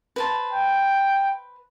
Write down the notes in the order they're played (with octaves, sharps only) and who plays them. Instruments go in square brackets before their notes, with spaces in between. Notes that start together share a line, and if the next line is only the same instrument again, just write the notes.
[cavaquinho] B4 C5 A5
[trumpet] G5